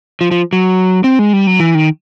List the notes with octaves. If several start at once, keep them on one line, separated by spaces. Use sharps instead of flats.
F3
F3
F#3
C4
G#3
G3
F#3
E3
D#3